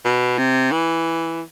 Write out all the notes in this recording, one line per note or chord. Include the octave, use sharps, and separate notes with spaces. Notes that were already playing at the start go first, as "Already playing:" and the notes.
B2
C3
E3